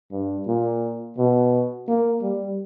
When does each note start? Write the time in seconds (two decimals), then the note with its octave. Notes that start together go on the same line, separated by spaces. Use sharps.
0.12 G2
0.47 A#2
1.18 B2
1.88 A#3
2.23 G3